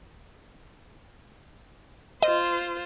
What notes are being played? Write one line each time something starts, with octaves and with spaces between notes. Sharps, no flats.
F4 C5 D#5